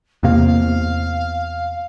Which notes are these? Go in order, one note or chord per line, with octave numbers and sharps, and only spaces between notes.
E2 C3 A#3 F5